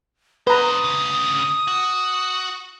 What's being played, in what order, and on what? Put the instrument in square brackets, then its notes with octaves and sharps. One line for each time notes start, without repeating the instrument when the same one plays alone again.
[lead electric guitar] D4 C5 [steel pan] B4 A#5 [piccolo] D#6
[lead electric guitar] D2 C#3
F#4